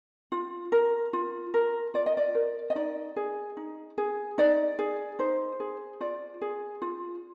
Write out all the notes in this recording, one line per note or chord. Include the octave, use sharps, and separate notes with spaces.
F4
A#4
F4
A#4
F4 D5
D#5
D5
A#4
D#5
D#4 D5
G#4
D#4
G#4
D#4 D5
G#4
D#4 C5
G#4
F4 D5
G#4
F4